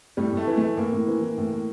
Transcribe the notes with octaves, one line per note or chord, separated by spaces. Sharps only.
A2 G3
A2 A3
E3
E3 A3
A2 A#3
A2
E3
E3
A2
A2